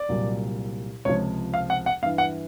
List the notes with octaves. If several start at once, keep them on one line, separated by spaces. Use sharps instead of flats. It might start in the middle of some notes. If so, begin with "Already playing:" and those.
Already playing: D5
C2 A#2 F#3
C#2 C3 F3 C#5
F5
F#5
F#5
G2 E3 F5
F#5